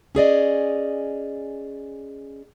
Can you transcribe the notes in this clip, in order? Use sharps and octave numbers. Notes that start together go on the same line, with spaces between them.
C#4 G#4 D5 D#5